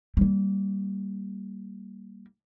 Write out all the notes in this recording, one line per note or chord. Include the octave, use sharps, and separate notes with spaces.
G3 A#3